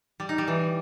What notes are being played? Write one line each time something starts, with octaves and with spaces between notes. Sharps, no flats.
G3
D#4
G3
E3